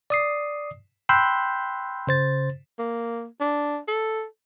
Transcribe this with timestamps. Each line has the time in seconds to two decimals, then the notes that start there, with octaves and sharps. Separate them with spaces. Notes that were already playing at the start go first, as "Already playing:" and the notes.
0.10 D5 D#6 C7
1.09 G5 B5 C6 E6 F#6 G6
2.07 C#3 C5 A6
2.79 A#3
3.40 D4
3.88 A4